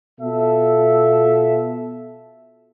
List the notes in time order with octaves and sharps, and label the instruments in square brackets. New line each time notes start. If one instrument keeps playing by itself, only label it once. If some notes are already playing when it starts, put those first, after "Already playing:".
[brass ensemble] B2 F4 A4 E5